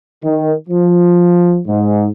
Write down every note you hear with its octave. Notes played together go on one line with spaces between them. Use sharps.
D#3
F3
G#2